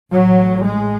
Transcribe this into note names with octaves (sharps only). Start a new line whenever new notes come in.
A1 A2 F#3
G#3